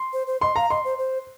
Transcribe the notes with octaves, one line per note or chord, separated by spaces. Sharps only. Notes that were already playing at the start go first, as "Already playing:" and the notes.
Already playing: C6
C5
C5
D#5 C6
F5 A#5
D#5 C6
C5
C5